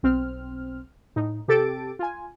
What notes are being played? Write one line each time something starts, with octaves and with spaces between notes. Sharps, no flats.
B1 C4 F6
A2 D#4
C3 G4 A4 A6 D7
F4 G#5